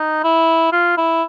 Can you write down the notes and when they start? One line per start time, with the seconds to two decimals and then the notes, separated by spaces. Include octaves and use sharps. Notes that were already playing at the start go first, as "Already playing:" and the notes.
Already playing: D#4
0.24 E4
0.72 F4
0.97 E4